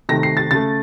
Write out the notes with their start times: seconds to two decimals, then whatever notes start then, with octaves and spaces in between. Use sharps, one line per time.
0.09 C3 D#3 A3 A#6
0.23 C7
0.37 A6
0.51 C#3 A3 A6